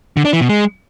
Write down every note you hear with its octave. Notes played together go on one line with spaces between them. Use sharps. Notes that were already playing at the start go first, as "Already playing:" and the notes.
D3
D4
E3
B2
G#3